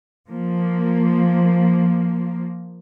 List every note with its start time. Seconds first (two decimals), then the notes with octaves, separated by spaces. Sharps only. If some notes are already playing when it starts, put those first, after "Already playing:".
0.30 F3 A#3